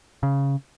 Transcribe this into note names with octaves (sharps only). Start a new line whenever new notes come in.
C#3